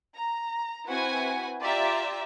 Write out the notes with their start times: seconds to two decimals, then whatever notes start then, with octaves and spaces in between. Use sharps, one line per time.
0.15 A#5
0.87 C4 E4 F#4 B4 F#5 G#5
1.63 F4 G4 D5 E5 A#5